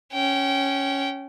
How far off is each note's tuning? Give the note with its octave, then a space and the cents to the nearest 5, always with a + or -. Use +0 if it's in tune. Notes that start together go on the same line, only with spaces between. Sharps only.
C#4 +0 G5 -25